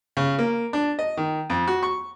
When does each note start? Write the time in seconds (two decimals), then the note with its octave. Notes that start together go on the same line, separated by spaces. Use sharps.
0.17 C#3
0.38 A#3
0.73 D4
0.99 D#5
1.17 D#3
1.50 F2
1.67 F#4
1.83 C#6